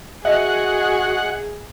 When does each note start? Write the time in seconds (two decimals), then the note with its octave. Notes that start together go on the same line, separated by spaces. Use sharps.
0.25 F#4 G#4 D#5 E5 F#5